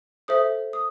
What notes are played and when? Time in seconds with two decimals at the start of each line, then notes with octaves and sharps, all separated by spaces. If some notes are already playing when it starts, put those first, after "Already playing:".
0.28 A4 C5 E5 D#6
0.73 D#6